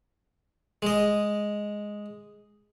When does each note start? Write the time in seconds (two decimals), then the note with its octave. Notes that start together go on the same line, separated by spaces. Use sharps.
0.82 G#3 D#5